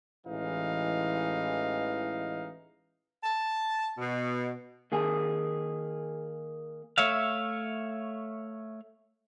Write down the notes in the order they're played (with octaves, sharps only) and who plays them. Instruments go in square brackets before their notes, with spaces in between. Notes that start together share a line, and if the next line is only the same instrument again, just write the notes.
[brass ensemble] A1 E3 G#3 D#4 F5
[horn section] A5
B2
[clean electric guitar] D#3 A#3 G#4
[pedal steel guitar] A3 C#5 E5 F5